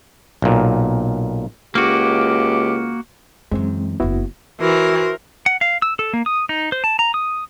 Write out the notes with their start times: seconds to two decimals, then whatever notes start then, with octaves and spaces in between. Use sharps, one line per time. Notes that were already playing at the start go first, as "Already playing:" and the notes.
0.42 B1 A#2
1.75 C#2 A#3 F#4 G4
3.51 F#2 E3 G#3 C4
4.00 F#1 E2 B3 E4 F#4
4.61 E3 F#4 A#4 C5
5.46 F#5
5.61 F5
5.82 E6
5.99 A4
6.13 A#3
6.26 D#6
6.49 D#4
6.72 C5
6.84 A5
6.99 A#5
7.14 D#6